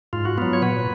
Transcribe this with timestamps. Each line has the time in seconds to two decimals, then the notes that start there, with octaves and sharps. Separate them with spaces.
0.13 G#2 F4
0.25 F#4
0.38 F#3 B3 F4
0.53 C#5
0.62 A#2 B4